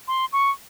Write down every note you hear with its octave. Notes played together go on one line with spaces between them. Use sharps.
C6
C#6